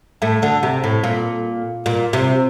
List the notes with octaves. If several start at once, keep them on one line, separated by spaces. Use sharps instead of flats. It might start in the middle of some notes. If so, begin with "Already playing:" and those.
A2 A3
D2 D3
C3
A2
A#2
A#2
C3